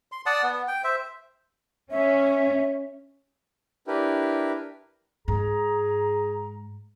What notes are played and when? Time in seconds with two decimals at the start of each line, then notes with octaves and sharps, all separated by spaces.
0.12 C6
0.26 D5 F#5 A5 D#6
0.43 B3
0.68 G5
0.84 C5 E5
1.91 C#4 E5
3.87 D4 E4 G4 A#4 B4
5.28 G#2 G#4 A#5